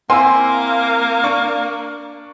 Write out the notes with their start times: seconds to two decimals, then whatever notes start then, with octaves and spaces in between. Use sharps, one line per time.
0.10 A#3 C4 E4 G#5 C6 E6
1.24 D4 C#6